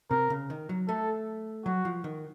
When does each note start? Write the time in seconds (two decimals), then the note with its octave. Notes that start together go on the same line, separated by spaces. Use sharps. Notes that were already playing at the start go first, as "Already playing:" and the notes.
0.10 C3 A#4
0.30 C#3
0.50 D#3
0.69 F#3
0.88 A3 A4
1.66 F#3 F#4
1.85 F3
2.04 D#3